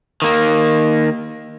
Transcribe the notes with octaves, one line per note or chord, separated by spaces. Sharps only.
D#3 A#3